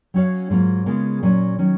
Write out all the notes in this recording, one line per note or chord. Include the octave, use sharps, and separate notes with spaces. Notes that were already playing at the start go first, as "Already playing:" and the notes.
F#3 C#4 F#4 C#5 F5
G#2 F#3 A#3 F4
C#3 G#3 B3 F4 A#4
A#2 F#3 C#4
D#3 F#3 C#4